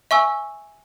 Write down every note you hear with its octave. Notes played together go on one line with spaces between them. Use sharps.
E5 G#5 C#6 E6